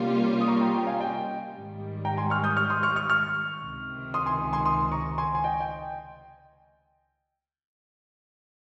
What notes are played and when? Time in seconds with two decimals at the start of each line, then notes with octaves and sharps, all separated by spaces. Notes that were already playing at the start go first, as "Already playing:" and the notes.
Already playing: C3 G3 A#3 C#4 F4
0.41 D#6
0.48 A#5 C#6
0.61 G5 A#5
0.74 G5 A#5
0.87 F5 G#5
1.00 D#5 G5
1.52 G#2 D#3 G3
2.05 G5 A#5
2.17 G#5 C6
2.30 C#6 F6
2.44 D#6 G6
2.56 C#6 F6
2.70 C6 D#6
2.83 C#6 F6
2.96 C#6 F6
3.09 C#6 F6
3.62 C#2 C3 D#3
4.14 C6 D#6
4.26 G#5 C6
4.53 G#5 C6
4.65 C6 D#6
4.92 A#5 C#6
5.18 G#5 C6
5.35 G#5
5.44 D#5 G5
5.60 G5